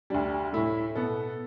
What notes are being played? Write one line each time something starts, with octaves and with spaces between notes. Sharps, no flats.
D2 D3 G3 D4
A2 A3 E4
B2 B3 A4